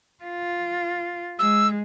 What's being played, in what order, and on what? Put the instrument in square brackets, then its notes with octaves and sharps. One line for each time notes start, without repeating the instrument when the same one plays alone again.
[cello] F4
[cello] G#3 [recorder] E6